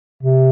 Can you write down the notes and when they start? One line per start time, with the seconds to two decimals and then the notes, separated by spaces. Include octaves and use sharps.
0.23 C3